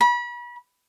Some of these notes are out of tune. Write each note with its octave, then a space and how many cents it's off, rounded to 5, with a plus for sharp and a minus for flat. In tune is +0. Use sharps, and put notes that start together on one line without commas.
B5 -35